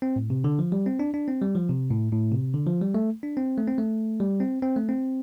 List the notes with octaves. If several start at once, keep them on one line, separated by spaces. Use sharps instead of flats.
C4
A2
C3
D3
F3
G3
C4
D4
D4
C4
G3
F3
C3
A2
A2
C3
D3
F3
G3
A3
D4
C4
A3
C4
A3
G3
C4
C4
A3
C4